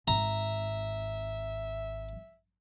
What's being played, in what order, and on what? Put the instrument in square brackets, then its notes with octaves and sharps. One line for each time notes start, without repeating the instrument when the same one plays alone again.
[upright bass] G#1 [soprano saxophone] E5 [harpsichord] A#5